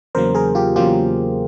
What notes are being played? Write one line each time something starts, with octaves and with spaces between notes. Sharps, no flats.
E2 C#3 F#3 A#3 A#4 C5
G#4 A#4
F4 G4
E2 C#3 F#3 A#3 F4 G4